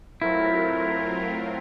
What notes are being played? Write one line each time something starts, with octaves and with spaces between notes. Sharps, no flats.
F#3 A3 C4 E4 F4 A#4